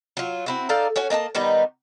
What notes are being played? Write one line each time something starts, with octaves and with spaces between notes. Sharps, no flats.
F#3 F4
C4 E4 F#4
D#4 A4 D5 F5
C#4 F#4 C#5 G#5
A#3 D#5 G#5 A5
D#3 G3 B3 D#4